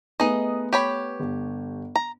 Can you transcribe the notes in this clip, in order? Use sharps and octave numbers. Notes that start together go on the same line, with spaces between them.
A3 B3 D#4 G#4 D#5
G4 C#5 B5
G1
A#5